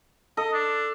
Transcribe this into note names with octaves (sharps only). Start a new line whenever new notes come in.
A4 D#5
D4